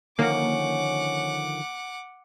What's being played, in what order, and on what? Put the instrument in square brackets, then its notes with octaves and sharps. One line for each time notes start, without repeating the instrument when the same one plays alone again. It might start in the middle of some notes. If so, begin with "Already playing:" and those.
[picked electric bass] D3 D#3 F3 [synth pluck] A#3 [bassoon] C#4 [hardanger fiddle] F#5 D6